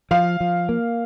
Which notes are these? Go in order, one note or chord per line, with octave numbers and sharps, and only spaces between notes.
F3 F5
F3
A#3